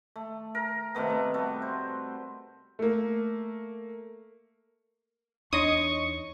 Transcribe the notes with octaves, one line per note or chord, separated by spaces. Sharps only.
A3
A#4
C3 D#3 A3 B3
A3
G3 A3 F#4
C5
A3 A#3
E2 D4 D#4 C#5 D#5 C6 C#6 D#6